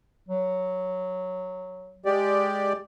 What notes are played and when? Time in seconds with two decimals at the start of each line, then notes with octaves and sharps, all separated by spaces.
0.29 F#3
2.06 G#3 G4 D5